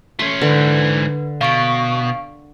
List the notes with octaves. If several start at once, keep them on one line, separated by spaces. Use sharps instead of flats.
A3 C#4 C6
G#2 D3 E3 B4
B2 F5 C#6 D7